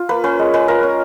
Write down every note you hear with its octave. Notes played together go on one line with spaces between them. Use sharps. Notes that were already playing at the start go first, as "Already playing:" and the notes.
Already playing: F4
A#3 B4
C#4 B4
G#3
G#3 B4
F4 A#4
C#4